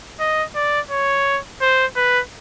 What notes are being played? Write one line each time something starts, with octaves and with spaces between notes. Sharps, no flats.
D#5
D5
C#5
C5
B4